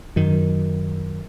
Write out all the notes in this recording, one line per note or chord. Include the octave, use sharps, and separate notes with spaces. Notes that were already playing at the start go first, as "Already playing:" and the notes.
F#2 D#3